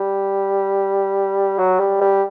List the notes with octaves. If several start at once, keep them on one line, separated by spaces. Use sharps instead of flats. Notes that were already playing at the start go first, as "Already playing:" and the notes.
Already playing: G3
F#3
G3
G3